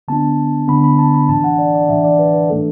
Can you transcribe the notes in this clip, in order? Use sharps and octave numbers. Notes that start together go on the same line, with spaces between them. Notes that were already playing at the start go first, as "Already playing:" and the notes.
D3 B3 D4 A5
D3 B3 D4 B5
B5
A5
B5
A2 E3 D4 A5
F#5
D5
D5
A2 E3 D4 E5
D5
B4
B4
E3 A3 D4 A4